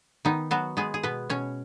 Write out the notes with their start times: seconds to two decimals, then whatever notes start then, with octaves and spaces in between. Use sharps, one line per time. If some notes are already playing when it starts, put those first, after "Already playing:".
0.25 D#3 B3 D#4
0.51 F#3 B3 F#4
0.77 G#3 B3 G#4
0.94 G#4
1.03 B2 B3 B4
1.30 B2 C#4 C#5